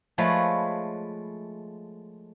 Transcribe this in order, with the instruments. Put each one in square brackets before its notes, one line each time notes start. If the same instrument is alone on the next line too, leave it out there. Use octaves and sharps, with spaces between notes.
[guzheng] F3 G#3 A3 B4 C#5